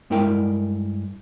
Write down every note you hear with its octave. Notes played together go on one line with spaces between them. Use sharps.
G2 G#3 A3 E4 A#4 G5